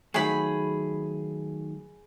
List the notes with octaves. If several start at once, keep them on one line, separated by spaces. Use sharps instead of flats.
D#3 F#3 A3 G#4 B5